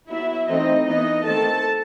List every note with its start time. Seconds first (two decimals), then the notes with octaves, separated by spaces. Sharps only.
0.09 F#3 B3 E4 E5
0.48 E3 A3 C4 D#4 D#5
0.86 E3 B3 D#4 D#5
1.25 D#3 A3 C4 A4 A5